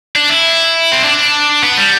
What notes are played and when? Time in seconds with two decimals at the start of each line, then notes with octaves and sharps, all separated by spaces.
0.16 D4
0.30 E4
0.92 C4
1.04 D4
1.63 B3
1.78 G3